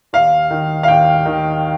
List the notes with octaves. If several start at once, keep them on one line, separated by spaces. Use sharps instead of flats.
D#2 F5
D#3
F5
D#2 G5
D#3